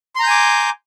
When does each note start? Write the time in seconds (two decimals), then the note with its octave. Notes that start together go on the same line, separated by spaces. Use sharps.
0.16 C6
0.20 A#5
0.23 G6
0.27 G#5
0.30 D6